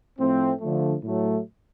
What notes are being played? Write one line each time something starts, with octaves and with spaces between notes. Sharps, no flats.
A2 F3 A3 C4
D3 F3 A3
A2 F#3 A3